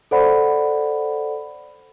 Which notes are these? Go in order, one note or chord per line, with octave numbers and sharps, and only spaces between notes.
A4 C5 D5 F#5 B5